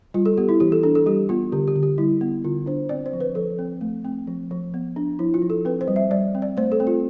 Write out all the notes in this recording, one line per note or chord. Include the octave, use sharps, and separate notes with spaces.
G3 F4
A4
B3 G4
E4
E3 G4
A4
D4 A4
A4
G3 G4
B3 F4
D3 G4
G4
D3
G4
G3 E4
B3
D3 F4
D4 C5
C4 D5
C5
F3
B4
F3 A4
C4
A3
C4
F3
F3
B3
D4
F3 E4
F4
F3
A4
C4 B4
C5
G3
E5
G3 D5
C4
D5
A3 C5
A4
C4
F4